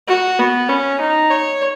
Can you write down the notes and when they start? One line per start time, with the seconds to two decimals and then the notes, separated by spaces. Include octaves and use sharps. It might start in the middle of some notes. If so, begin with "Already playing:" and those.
0.08 F#4
0.39 B3
0.69 C#4
1.01 D#4
1.31 C#5